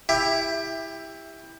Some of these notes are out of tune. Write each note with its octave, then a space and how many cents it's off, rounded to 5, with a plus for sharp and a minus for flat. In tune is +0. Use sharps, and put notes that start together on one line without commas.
E4 +0 G4 +20 E5 +10